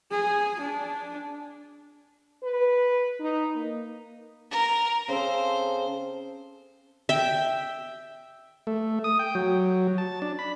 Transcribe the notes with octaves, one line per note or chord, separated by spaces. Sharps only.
G#4
D4
B4
D#4
A#3
A#4
C#3 C4 A4 C5
E5 G5
A3
D#6
G5
F#3
A5
D4
B5